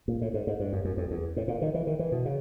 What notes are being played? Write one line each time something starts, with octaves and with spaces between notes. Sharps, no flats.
A#2
A2
G#2
G#2
G2
F#2
F#2
F2
E2
A2
A#2
D#3
E3
D#3
E3
B2
C#3